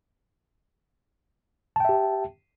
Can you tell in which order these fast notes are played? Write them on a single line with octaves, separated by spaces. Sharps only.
A5 G5 E5 G4